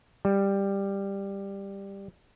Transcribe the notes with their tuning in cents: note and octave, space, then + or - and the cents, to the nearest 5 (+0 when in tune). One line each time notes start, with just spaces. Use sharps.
G3 +10